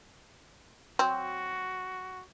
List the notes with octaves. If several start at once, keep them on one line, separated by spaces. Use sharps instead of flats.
F#3 C4 F#4